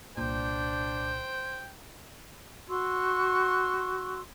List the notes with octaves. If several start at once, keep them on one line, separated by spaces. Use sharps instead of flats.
C2 A#2 D4 C5 G5
F#4 C6 C#6 E6